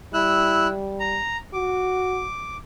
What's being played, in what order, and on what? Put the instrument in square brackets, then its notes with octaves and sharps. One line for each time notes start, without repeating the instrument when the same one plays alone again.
[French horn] G3 [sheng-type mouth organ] E4 E6 F#6
[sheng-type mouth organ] A#5
[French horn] F#4 [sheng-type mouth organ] D6